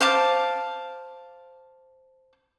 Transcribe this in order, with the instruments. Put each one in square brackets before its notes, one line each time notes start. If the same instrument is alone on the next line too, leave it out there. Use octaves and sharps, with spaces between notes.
[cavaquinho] C5 F5 A5 D6